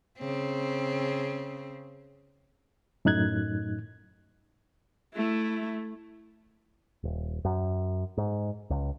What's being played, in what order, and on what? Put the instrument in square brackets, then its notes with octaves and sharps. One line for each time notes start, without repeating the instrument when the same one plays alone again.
[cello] C#3 C4
[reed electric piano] F#2 A2 D#4 F#6 G#6
[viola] A3 E4
[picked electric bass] D#1
F#2
G#2
C#2